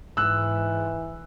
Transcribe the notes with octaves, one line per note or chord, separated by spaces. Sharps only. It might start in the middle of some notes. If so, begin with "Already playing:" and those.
G#2 E3 E6 F#6